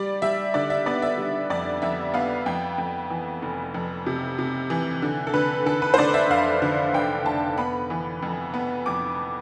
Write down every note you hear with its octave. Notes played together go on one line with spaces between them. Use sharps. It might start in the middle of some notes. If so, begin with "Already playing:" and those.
Already playing: G3 D5
G3 E5
D3 D5
E5
B3 D5
E5
G3
F2 D5
F2 E5
B3 F5
F2 G5
F2
E3
F1
F2
C3
C3
E3
D3
A4
D3 B4
D3 A4
B4
C5
D3 D5
E5
F1 F5
D3
F1 G5
F1 A5
B3 B5
E3
F2
B3
F2 D6